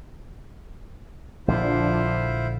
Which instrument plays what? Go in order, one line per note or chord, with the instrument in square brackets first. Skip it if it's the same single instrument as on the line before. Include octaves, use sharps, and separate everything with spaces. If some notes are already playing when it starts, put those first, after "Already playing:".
[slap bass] A#1 D3 [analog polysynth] F3 D4 [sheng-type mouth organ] E4 F4 C5